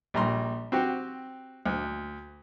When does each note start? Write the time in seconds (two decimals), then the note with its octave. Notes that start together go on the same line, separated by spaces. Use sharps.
0.14 A#1 G3 A#5 C6
0.72 C4 F#4 G4
1.66 D2